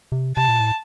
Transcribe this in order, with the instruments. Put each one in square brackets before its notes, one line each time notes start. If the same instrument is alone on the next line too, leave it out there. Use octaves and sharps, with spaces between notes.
[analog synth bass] C3
[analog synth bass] C3 [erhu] A5
[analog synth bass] A#2
A2